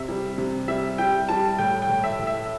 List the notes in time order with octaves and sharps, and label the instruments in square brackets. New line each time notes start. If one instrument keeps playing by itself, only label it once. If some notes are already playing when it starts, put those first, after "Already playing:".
Already playing: [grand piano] C3 E5
G3
C3
G3 E5
G3 G5
G3 A5
A2 G5
G5
A2
E5
A2
E5